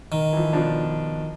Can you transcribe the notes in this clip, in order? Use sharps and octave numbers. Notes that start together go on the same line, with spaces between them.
D#3
E3 F3
B2 F3 D4